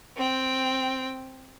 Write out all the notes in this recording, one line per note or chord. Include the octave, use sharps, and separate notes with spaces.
C4 G5